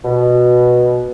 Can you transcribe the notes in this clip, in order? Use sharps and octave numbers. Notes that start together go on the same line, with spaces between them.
B2